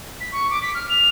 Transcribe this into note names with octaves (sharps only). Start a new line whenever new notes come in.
B6
C#6
D6
B6
F6
F7